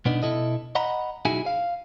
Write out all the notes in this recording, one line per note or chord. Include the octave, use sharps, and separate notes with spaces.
B2 B3 D4 D#4
B2 E4 A4 D#5
D#5 F#5 A#5 B5
B1 D#4 E4 F#4 G#4 G#5
F5